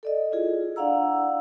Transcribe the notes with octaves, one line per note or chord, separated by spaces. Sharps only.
A4 D5 D#5
E4 F4 G#4
D4 D5 F5 F#5 A#5 E6